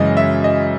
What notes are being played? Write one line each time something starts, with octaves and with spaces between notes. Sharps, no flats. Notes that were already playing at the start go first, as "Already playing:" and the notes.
Already playing: F#2 C#3 E3 G#3 D#5
E5
D#5